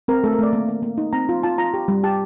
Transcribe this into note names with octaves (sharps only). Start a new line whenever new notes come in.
C4 A#4
A3 A4
A#4
A3 D5
A#3
A#3
A#3
D#4
C4 A#5
F4
F4 A5
F4 A#5
G4
G3
G4 A5